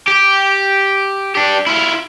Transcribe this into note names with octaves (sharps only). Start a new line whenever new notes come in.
G4
D4 G4
E4 F4